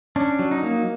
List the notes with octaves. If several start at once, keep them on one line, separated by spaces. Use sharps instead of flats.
C#4 D4
F#3
D#4
A#3